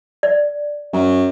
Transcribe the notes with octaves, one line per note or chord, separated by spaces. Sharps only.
D5
F#2